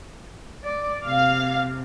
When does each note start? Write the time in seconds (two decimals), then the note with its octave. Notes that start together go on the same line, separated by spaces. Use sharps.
0.64 D5
1.04 C3 F5